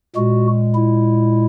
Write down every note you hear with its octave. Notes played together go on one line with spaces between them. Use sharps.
A#2 G#3 F#4
E4